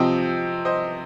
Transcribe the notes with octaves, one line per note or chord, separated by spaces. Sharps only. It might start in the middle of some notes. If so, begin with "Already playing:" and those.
Already playing: C3 F3 C4 D#5 G5
C5 D#5